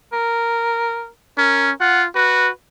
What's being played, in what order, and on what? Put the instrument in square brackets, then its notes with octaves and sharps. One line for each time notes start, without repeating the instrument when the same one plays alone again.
[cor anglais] A#4
[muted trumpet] C#4 [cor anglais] A#4
[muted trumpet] F4 [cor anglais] F#5
[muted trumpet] F#4 [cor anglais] B4